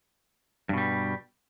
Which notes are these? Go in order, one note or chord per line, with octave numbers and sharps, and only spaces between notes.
G2 B2 G3